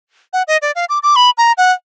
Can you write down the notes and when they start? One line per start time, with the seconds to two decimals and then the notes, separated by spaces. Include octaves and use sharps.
0.33 F#5
0.48 D#5
0.62 D5
0.76 F5
0.89 D6
1.03 D6
1.16 B5
1.38 A#5
1.58 F#5